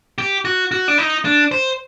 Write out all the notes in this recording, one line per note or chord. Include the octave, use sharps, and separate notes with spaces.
G4
F#4
F#4
D4
D#4
D4
C5